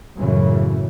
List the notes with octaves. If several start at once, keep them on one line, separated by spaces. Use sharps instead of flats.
F#2 A2 C#3 E3